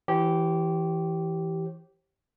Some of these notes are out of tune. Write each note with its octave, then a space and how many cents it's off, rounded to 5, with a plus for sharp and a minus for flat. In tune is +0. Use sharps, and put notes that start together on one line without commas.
E3 +0 G4 -15 C#5 -45